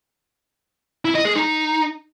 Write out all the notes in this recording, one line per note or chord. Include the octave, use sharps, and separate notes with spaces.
E4
D#5
G#4
D#4